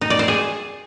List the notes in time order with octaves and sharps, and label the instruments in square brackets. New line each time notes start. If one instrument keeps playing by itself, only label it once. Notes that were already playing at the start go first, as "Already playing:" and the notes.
[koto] D#4
D5
C5
G#4